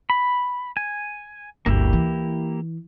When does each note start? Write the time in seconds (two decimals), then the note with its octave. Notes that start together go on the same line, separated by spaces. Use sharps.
0.10 B5
0.77 G#5
1.66 G1 D2 A#3 E4 G4
1.93 E3